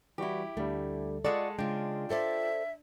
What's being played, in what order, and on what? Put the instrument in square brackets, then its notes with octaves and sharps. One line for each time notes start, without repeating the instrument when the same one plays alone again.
[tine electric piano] E3 G3 F#4 [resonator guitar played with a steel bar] E4 G4
[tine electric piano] D2 D3 G3 [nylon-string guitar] A3
[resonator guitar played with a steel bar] G#3 A4 [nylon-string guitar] F4 D5 [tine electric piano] F5 F#5 C#6
[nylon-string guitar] C#3 G#3 [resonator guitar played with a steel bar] D4 [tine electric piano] F4 G5
[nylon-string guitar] A4 C5 D5 [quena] E5